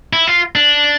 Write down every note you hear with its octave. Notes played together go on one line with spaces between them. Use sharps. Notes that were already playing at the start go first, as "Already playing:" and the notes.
E4
F4
D4